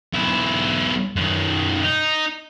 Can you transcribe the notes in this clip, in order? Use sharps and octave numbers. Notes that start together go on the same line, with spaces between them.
B1 E4
F#2 D#3
D#4